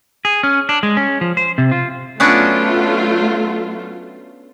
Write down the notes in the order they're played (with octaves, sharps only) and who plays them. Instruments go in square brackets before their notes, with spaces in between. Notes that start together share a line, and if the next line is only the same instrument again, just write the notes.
[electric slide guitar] G#4
C#4
D4
G#3
C#4
F3
C5
C3
F4
[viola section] F#3 A3 F4 [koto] B3 C#4 D4